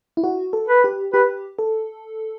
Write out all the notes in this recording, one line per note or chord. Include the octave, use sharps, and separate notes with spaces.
E4
F#4
A4
B4
G4
G4 B4
A4